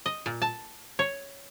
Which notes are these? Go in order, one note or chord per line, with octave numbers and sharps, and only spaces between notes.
D#5
A#2
A5
C#5